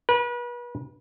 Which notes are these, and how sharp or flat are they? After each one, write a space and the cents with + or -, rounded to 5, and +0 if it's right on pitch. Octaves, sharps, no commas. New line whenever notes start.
B4 -35